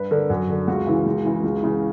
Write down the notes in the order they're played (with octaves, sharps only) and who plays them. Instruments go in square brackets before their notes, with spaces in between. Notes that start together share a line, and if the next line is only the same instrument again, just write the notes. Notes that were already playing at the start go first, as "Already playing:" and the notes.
Already playing: [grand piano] G2 B4
D3 A#4
F#2 F#4
D3
C#2 F#4
C#3 E3
C#2
C#3 E3
C#2
C#3 E3